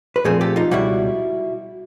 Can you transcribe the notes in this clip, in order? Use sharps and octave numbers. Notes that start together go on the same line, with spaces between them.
B4
A#2 F3 A3 C4 G#4 A#4
G4 A4
D#4 F4
C#2 B2 G3 E4 F#4